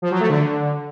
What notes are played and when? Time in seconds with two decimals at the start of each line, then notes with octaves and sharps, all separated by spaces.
0.02 F3
0.11 F#3
0.20 A3
0.29 D3